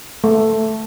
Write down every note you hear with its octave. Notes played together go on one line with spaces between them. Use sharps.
A3